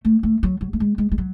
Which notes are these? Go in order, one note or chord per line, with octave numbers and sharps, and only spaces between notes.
A3
A3
F#3
F#3
A3
G#3
G#3
G#3
F#3